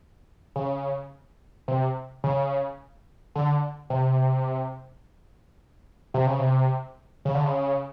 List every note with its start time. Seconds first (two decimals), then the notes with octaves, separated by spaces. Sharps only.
0.56 C#3
1.68 C3
2.24 C#3
3.35 D3
3.90 C3
6.14 C3
6.26 C#3
6.39 C3
7.25 C#3
7.34 D3
7.44 C#3